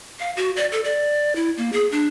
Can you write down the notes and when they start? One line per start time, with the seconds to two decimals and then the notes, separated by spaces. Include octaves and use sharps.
0.20 F5
0.37 F#4
0.56 D5
0.72 A4
0.84 D5
1.35 E4
1.57 A#3
1.73 G#4
1.92 D4